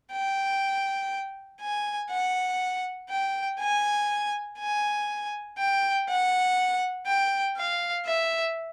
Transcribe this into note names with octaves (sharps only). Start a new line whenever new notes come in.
G5
G#5
F#5
G5
G#5
G#5
G5
F#5
G5
F5
E5